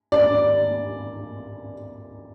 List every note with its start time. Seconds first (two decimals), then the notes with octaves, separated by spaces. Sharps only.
0.12 D5